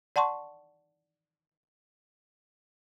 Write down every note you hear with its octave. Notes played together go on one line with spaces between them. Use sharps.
D5 F#5 A5 C6 C#6